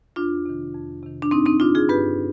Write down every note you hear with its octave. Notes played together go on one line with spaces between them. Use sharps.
F2 D4 F4
C3 D#3
F2
C3 D#3
D4
G2 C4 D#4
C4 D#4
D3 D4 F4
F4 G#4
G2 G4 B4